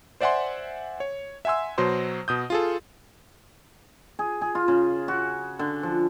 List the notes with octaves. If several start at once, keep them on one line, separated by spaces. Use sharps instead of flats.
C5 D5 E5 F#5 G#5 C6
C#5
E5 F#5 G#5 C6 E6
B2 F#3 C5 C6
B2 D#6 G6
F4 G#4 A4
G#4
G#4
F4
C#3
F#4
D3
F3